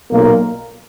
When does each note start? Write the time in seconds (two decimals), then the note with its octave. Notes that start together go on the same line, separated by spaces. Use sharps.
0.11 B1 A#2 A#3